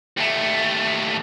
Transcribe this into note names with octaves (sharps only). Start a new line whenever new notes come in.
D#2 A3